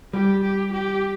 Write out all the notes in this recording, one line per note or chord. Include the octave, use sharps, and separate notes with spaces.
G3 G4
G4
G4